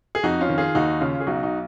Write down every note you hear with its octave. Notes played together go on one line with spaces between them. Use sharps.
G#4
F2 D#4 F#4
C#4 F4
D#3
F4 G#4
D#2 D#4 F#4
C#3 C#4 F4
G#4
B1 D#4 F#4
D#4 F#4